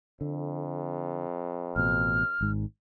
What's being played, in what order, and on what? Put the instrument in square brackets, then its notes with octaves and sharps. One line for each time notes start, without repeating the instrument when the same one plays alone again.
[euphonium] F2 [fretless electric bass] D3
[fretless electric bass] A1 B2 [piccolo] F6
[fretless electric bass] G#1 G#2